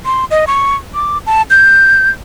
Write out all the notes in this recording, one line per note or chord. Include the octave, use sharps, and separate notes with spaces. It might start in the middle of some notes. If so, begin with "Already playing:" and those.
C6
D#5
C#6
D6
A5
G6